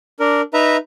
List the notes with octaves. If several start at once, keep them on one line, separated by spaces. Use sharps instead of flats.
D4 A#4
D#4 B4 E5 A#5